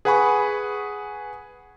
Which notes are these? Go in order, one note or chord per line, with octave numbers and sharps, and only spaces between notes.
G#4 B4 F#5 G#5 B5 C#6